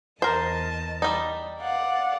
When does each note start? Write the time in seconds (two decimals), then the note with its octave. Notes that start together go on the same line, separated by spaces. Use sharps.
0.22 E2 A#4 C5 D#5 A5
1.02 G3 D#4
1.61 D5 F5 F#5